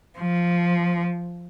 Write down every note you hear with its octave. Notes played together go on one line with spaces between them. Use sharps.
F3